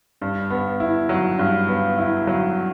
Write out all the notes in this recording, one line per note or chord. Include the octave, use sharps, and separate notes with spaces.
G2
B3
E4
F#3
G2
B3
E4
F#3